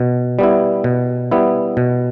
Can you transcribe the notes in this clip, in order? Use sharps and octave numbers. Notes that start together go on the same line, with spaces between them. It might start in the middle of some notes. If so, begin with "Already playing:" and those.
Already playing: B2
G3 B3 E4
B2
G3 B3 E4
B2